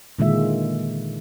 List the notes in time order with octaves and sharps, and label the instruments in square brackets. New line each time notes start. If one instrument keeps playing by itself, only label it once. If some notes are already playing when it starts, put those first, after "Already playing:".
[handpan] A#2 D3 D#3 G#3 F4 E5